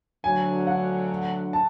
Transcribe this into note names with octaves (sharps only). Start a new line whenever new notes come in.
D2 D3 F#3 G#5
F#5
A5